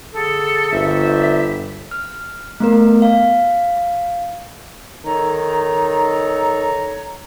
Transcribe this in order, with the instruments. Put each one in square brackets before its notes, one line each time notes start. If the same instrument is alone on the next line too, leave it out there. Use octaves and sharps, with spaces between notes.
[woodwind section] D3 G#4 A4
[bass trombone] G1 [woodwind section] C5 D5 E5
[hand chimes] F6
A3 B3 A#4
F5
[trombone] D#3 [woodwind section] A4 C#5 A#5